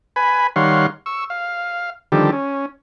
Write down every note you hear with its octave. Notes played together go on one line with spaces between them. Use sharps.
B4 G#5 B5
D#3 G3 C#5 F5 F#5 C6
C#6 E6
F5
D3 D#3 F3 G3 G4 A4
C#4